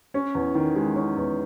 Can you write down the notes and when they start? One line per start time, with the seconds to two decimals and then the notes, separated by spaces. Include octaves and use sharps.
0.14 C#4
0.35 E2
0.55 D#3
0.76 G#3
0.96 C#4
1.17 E2